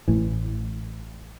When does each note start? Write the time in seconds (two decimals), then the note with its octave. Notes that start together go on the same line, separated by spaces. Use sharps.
0.08 A1 A2 E3